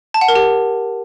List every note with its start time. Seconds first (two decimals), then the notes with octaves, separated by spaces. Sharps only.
0.14 A5
0.21 F#5
0.28 A#4
0.35 G4